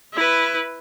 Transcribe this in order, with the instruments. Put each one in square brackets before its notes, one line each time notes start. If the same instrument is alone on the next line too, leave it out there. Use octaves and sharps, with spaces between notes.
[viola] E4 B4